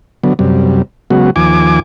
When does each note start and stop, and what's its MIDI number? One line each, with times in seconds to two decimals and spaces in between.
0.24 0.33 50
0.24 0.33 54
0.24 0.33 59
0.39 0.82 42
0.39 0.82 48
0.39 0.82 55
1.10 1.30 49
1.10 1.30 54
1.10 1.30 56
1.10 1.30 59
1.10 1.30 66
1.36 1.80 39
1.36 1.80 53
1.36 1.80 80
1.36 1.80 86